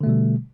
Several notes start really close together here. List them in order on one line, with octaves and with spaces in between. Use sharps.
D3 A3 B2 G3